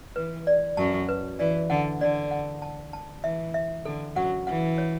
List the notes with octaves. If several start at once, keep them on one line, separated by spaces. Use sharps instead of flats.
E3 B4
D5
F#2 F#3 A5
B4
E3 D5
D3 F#5
D3 D5
F#5
A5
A5
E3 E5
E5
D3 A4
F#2 F#3 F#5
E3 F#5
C#5